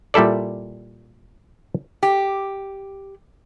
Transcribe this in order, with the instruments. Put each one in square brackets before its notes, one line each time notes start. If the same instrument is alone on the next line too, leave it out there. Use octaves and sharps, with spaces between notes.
[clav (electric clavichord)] A#2 G3 E4 A4 D5
[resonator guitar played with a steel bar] G4